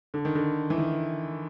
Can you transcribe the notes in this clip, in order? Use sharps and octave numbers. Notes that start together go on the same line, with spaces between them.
D3
D#3
D3
E3
D#3